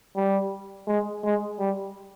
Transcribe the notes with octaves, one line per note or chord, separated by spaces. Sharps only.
G3
G#3
G#3
G3